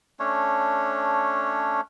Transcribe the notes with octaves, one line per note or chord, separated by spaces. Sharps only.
A3 C#4 D4 C#5